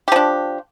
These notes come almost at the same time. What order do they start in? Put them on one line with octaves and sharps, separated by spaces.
G4 F3 D4